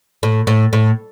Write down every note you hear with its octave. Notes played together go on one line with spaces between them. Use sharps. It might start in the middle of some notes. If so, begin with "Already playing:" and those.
A2
A2
A2